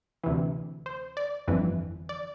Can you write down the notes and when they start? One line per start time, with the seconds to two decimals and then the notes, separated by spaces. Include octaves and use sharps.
0.24 D2 C3 E3
0.86 C5
1.17 D5
1.48 G1 F2 E3
2.09 D5